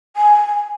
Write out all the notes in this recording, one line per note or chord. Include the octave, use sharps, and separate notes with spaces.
G#5